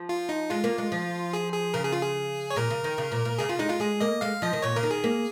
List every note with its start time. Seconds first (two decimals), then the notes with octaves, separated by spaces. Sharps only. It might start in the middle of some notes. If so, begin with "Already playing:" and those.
Already playing: F3
0.09 F4
0.29 D#4
0.50 G#3 F4
0.64 A#3
0.78 G#3
0.92 F3
1.33 G#4
1.53 G#4
1.74 C#3 A#4
1.84 G#4
1.93 F4
2.02 G#4
2.50 C#5
2.56 A#2 A#4
2.70 C#3
2.84 D#3
2.98 C#3
3.12 A#2
3.25 A#2
3.39 C#3 G#4
3.49 C#3 F4
3.59 G#3 D#4
3.70 G#3 F4
3.80 G#3 G#4
4.00 A#3 D#5
4.21 G#3 F5
4.42 F3 D#5
4.53 D#3
4.62 A#2 C#5
4.76 C#3 A#4
4.83 D#3
4.91 G#4
5.04 A#3